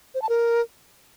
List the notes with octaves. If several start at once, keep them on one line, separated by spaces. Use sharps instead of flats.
C5
A5
A#4